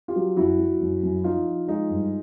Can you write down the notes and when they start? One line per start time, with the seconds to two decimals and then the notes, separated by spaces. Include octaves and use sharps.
0.08 F4 G4
0.16 F#3
0.36 F#2 E4 F#4
0.59 F#3
0.81 F#2
1.03 F#2
1.24 F3 D#4 F4
1.47 F3
1.68 G#3 D#4 F4
1.90 G2